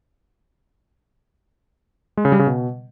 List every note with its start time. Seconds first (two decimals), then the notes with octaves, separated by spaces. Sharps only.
2.17 G#3
2.25 C#3
2.32 G3
2.39 C#3
2.47 B2